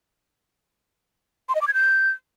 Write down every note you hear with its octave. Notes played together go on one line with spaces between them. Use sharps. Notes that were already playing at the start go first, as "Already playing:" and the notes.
C6
D#5
D6
G#6
G6